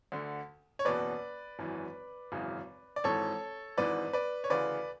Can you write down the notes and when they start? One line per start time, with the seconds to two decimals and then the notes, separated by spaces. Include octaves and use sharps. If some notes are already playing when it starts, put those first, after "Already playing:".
0.12 D2 D3
0.79 C#5
0.85 F#1 E2 B2 B4 D5
1.59 G#1 F#2 E3
2.32 G#1 F#2 C#3 E3
2.96 D5
3.04 G#1 G#2 E3 A4 C#5
3.78 G#1 G#2 E3 B4 D5
4.13 B4 D5
4.44 C#5
4.50 D2 C#3 E3 B4 D5